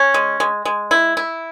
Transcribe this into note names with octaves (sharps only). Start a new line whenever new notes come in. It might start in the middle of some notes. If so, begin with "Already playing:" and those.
Already playing: C#4
G#3
G#3
G#3
E4
E4